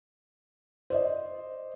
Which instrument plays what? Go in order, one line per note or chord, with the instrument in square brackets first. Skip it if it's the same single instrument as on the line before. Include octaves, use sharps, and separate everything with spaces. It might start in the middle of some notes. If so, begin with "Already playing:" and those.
[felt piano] C5 D5 D#5